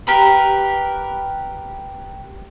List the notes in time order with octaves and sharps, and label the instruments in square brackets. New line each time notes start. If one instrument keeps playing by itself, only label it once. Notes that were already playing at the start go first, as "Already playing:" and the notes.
[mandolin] G4 A#4 B4